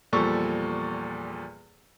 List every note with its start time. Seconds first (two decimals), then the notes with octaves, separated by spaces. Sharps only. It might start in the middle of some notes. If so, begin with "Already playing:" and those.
0.13 E2 A#2 F3 G3 A4 C#6